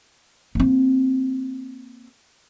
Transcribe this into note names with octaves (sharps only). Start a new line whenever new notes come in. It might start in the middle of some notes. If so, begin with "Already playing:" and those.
A#3 C4